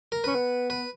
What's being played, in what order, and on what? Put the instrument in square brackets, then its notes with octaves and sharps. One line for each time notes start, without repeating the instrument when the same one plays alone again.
[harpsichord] A#4
[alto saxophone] C#4 [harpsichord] B4
[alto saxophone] B3
[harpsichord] B4